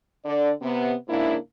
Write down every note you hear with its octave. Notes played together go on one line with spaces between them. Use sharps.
D3 D5
C3 B3
G#2 C#3 A#3 D4 E4